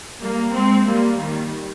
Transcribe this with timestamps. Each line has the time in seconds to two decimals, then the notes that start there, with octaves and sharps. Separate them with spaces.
0.21 G3 A#3
0.54 G#3 C4
0.86 G3 A#3
1.18 D#3 G3